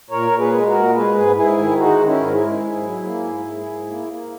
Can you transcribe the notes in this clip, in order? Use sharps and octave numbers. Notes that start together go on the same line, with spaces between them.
A#2 A#4 C#5
A#2
G#4 B4
G#3
B4
F#4 A#4
A#2
G#3 G#4 B4
G#2
G#2 E4 G#4
D#3
G#3 D#4 F#4
D#3
C#4 E4
G#2 A#4
E4 G#4
G#3
G#2
F#3
A#3
G#2
G#2
G#2
A#3
A#3